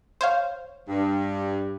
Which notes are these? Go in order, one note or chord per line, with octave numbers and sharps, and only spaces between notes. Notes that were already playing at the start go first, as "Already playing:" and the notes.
C5 C#5 F5
G2